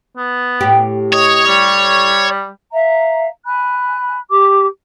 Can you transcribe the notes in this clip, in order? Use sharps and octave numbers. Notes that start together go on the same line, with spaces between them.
B3
A2 G4
C#5 D#5
G3
E5 F5 A#5
G#5 B5 F#6
G4 D6